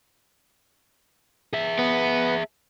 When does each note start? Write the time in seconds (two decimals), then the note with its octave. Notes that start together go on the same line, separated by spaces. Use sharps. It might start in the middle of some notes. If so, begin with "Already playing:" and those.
1.53 G#4 E5
1.79 B3